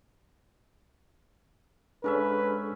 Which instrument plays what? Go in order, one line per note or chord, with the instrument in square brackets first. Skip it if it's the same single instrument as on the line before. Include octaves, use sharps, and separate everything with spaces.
[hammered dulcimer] G#2 C#4 E5 [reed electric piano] D4 G#4 A4 [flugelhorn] B4